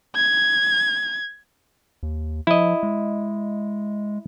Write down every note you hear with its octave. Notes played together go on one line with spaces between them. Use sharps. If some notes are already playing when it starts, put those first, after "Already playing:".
G#6
D#2
F3 E4 D#5
G#3